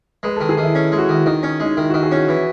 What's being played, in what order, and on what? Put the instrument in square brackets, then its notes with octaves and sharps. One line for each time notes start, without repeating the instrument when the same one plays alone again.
[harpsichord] G#3 [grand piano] B4
[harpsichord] D#3 [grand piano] A4
[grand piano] G#4
[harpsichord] D#3
[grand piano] E4
[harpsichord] C#4
G#3
[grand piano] F#4
[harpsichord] D#3 [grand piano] E4
[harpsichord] D#3 [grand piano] D#4
[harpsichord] C#4
G#3
[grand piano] D#4
[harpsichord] D#3 [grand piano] E4
[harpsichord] D#3 [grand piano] F#4
[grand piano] G#4
[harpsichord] C#4 [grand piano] F#4
[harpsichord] E3